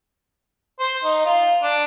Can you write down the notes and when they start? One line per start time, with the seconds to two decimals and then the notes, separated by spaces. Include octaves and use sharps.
0.80 C5
1.04 D#4
1.26 F4
1.63 D4